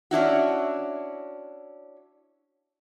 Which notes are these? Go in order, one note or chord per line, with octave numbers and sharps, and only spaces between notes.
C#4 D4 E4 F#4